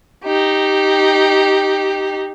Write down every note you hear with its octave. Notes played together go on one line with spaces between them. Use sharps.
D#4 G4